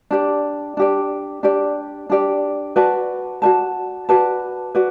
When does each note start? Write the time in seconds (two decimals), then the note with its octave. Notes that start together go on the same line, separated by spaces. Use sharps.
0.11 D4 G4 D5
0.77 D4 G4 D5
1.43 D4 G4 D5
2.10 D4 G4 D5
2.76 F#4 B4 D5 A5
3.42 F#4 B4 D5 A5
4.09 F#4 B4 D5 A5
4.75 F#4 B4 D5